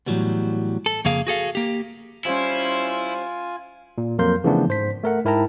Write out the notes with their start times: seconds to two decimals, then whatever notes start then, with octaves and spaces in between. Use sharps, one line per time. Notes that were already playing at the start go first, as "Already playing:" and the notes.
0.06 A2 E3 F#3 G3 B3
0.86 A4
1.05 F2 C#3 A#3 G#4 F5
1.27 F#4 G#4 A4 F5
1.55 A#3 G4
2.25 G3 C#4 E4 F4 C5 G#5
3.98 A#2
4.18 F2 F#3 A#3 A#4 C6 G6
4.44 C#3 E3 F3 A3 B3 D4
4.68 G#2 C5 B6
5.03 A3 A#4 F#5
5.25 G#2 E4 A#4 G5 A5 A#5